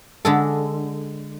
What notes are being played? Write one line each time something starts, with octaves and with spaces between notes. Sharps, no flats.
D3 G#3 A4